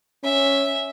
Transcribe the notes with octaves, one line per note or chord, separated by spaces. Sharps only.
C#4 E5